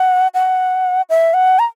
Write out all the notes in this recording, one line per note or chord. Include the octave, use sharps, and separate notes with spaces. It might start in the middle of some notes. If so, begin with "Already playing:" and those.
Already playing: F#5
F#5
E5
F#5
A#5